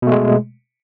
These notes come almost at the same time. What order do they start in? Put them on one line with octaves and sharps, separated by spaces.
B2 A3 G#3